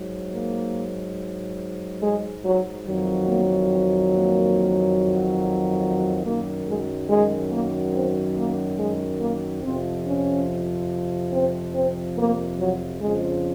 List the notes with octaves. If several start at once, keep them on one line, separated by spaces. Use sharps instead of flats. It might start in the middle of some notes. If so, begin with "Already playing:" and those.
Already playing: G#2 F#3
A#3
G#3
F#3
F2 D#3 F#3
A#3
C4
A#3
F#2 D#3 F#3 A#3
G#3
G#3
A#3
C4
A#3
G#3
A#3
F2 C3 F3 C4
C#4
C4
C4
A#3
F#3
F2 C#3 F3 G#3